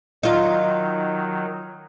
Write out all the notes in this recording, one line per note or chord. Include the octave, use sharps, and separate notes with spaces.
D#3 F#3 D#4 F4